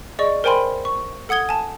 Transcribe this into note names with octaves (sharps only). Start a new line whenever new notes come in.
G#4 D5 D#5 C#6
A#4 C5 G5 G#5 B5 C6
C#6
A4 F#5 D#6 G#6 G7
G#5 A5